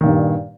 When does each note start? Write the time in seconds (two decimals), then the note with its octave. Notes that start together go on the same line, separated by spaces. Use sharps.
0.01 D#3
0.03 A#2
0.06 G2